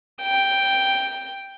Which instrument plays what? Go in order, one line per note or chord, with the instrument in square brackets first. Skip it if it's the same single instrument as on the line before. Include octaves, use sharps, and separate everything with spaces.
[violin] G5